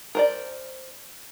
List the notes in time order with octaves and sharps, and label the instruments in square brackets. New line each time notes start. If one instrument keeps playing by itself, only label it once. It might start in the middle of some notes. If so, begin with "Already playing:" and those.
[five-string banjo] A#4 C5 D5